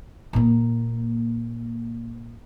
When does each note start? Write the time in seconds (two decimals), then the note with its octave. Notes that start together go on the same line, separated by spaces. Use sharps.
0.33 A#2 A#3